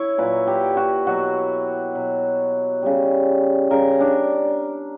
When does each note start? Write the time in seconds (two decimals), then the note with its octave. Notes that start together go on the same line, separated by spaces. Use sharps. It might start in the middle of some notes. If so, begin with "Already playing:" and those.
Already playing: E4 C#5
0.18 A#2 F#3 B4
0.47 G4
0.77 F#4
1.07 B2 F#3 F#4
1.95 B2 F#3
2.83 C#3 G3
3.71 C#3 G3 A#4
4.00 D4